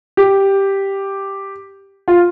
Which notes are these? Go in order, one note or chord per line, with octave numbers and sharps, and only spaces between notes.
G4
F4